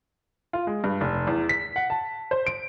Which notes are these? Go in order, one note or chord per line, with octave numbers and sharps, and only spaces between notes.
F4
G#3
G2
F1
E2
B6
F#5
A5
C5
D7